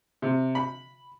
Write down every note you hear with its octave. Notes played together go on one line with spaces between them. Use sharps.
C3
B5